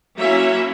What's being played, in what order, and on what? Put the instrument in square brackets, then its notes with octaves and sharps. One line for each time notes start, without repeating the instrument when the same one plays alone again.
[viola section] F#3 A#3 C#4 E4 E5